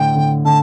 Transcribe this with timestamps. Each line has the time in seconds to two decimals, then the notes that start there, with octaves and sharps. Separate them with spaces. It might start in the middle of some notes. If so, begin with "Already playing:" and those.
Already playing: A2 D3 G5
0.15 D3
0.45 D3 A5